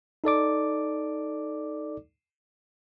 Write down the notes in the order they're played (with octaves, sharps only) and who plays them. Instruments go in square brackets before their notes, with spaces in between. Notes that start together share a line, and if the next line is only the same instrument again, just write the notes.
[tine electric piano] D#4 A4 D5 D6